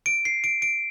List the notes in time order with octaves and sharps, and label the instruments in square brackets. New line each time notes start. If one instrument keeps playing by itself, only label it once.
[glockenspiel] D7
C7
D7
D7